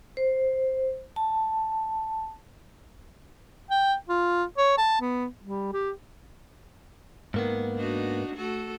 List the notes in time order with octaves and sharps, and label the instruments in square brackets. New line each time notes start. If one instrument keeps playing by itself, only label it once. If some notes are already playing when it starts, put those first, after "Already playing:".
[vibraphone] C5
A5
[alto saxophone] G5
F4
C#5
A5
B3
G3
G4
[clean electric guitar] G#2 A#3 B3 [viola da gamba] D#3
[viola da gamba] D4 D#4 F#4
A3 F#4 A4